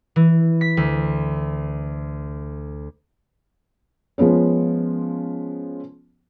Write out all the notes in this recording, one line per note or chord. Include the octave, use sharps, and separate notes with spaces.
E3
B6
D2
F3 G#3 B3 C#4